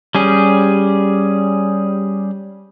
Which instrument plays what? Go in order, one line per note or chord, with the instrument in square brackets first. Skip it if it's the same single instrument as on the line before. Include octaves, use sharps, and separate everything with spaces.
[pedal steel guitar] G3 C#4 G#4